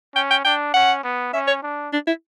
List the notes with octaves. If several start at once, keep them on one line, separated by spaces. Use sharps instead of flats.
C#4 G5
G5
D4 G5
C#4 F#5
B3
C#4 E5
C#5
D4
D4
E4